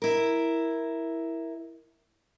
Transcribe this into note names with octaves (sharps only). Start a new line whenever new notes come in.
E4 A#4